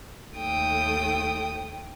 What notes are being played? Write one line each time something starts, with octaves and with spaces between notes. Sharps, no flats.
D#2 A3 G5 D#6